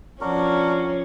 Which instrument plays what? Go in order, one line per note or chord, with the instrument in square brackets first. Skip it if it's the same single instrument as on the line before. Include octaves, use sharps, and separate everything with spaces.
[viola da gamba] F3 C#4 [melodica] D4 F#4 A#4